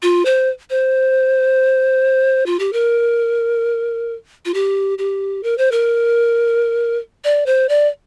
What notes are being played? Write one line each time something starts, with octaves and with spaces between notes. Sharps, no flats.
F4
C5
C5
F4
G4
A#4
F4
G4
G4
A#4
C5
A#4
D5
C5
D5